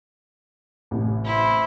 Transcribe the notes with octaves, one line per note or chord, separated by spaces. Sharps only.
A1 A2 C3
E4 C5